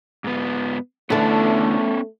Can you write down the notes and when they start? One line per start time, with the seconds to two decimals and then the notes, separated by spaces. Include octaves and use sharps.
0.24 G#2 B3
1.10 E2 D3 A3 B3 C#4 A5